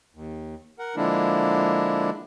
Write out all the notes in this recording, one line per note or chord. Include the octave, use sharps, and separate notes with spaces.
D#2
A#4 F#5
D3 F3 G#3 A#3 D4 E4